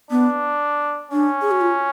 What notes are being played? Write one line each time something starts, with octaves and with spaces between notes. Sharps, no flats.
B3 D4
C#4 D4
G#4
F#4
F4